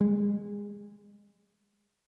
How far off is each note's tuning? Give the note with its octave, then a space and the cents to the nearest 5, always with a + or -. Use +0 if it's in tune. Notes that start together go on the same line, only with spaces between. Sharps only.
G#3 -25